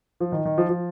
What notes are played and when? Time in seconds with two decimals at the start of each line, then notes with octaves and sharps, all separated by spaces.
0.20 F3
0.32 D#3
0.45 D#3
0.58 F3
0.69 F3